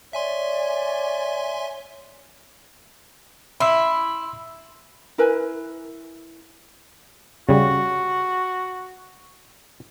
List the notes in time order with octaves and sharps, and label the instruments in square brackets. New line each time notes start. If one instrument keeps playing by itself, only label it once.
[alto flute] C#5 [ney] D5 [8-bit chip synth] E5 G#5 C6
[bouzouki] E4 [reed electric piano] B5 C6 E6
[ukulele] E4 A#4 B4 G#5
[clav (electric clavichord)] C#3 G3 [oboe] F#4